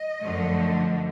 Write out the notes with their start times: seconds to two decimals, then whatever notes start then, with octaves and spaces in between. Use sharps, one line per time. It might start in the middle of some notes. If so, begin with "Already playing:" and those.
Already playing: D#5
0.21 F#2 D3 F3 A3